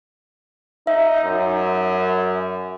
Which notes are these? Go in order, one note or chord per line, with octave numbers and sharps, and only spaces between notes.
D#4 E5
F#2